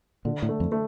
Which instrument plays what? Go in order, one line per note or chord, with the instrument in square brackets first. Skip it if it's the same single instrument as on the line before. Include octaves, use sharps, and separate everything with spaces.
[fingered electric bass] A#2 [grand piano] D3
[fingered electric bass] A2
[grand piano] A3
[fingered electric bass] F2
[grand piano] A3